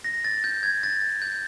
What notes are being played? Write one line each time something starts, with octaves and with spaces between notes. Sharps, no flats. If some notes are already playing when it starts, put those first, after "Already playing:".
A#6
A6
G6
G#6
A6
G6